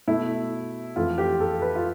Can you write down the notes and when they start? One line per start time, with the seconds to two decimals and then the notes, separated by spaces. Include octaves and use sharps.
0.07 B2 A3 E4
0.96 F2 E3 A3 F4
1.18 G4
1.40 A4
1.62 B4
1.75 F4